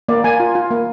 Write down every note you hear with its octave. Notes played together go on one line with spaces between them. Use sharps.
A#3 D5
A#3 G#5
F4
F4
A#3